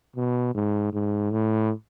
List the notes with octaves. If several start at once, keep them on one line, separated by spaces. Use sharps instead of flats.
B2
G#2
G#2
A2